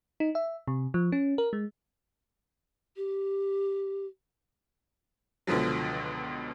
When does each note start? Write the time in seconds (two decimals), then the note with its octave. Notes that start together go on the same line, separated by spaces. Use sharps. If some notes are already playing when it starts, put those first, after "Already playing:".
0.20 D#4
0.35 E5
0.68 C3
0.94 F3
1.12 C#4
1.38 A#4
1.53 G#3
2.96 G4
5.47 C#2 B2 D3 F3 F#3